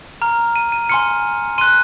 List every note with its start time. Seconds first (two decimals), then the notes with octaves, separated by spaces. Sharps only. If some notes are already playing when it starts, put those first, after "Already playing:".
0.22 A#5 F6
0.56 D#7
0.72 D#7
0.89 G#5 C6 F6 C#7
1.58 C6 F#6 D#7